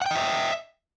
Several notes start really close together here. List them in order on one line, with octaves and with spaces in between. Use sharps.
F#5 G5 D#5 E5